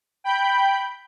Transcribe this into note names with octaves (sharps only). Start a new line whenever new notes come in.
G5 B5 G6